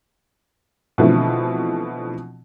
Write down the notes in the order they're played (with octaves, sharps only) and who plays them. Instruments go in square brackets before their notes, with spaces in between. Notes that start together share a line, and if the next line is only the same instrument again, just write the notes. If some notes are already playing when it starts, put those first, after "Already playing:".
[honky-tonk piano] B2 D3 E3 F3 A3 C4